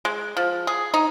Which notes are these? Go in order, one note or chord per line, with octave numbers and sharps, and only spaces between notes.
G#3
F3
G#4
D#4